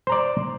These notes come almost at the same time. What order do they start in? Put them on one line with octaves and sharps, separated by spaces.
C5 A#5 D5